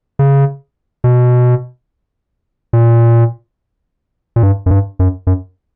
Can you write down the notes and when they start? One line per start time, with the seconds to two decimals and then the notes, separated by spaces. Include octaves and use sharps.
0.19 C#3
1.04 B2
2.73 A#2
4.36 A#2
4.43 G2
4.66 F#2
4.71 G2
4.99 F#2
5.27 F#2